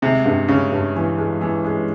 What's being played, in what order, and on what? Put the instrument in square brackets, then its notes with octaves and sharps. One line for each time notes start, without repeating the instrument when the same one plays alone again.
[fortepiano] C3 [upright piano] G#3
[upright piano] G2
[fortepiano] C#3 [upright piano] C#4
[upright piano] G2
E3
G#3
E3
G#3